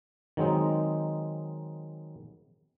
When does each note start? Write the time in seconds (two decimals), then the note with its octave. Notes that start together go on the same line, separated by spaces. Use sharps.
0.37 D#3 F#3 G#3 C4 D#4